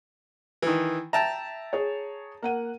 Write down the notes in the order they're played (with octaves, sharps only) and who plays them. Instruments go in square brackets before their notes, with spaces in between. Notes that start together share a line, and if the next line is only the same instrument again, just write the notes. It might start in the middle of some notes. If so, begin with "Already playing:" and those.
[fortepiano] D#3 E3
[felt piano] E5 [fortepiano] G5 A5 A#5
[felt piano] G#4 C#5
A#3 F#5 D#7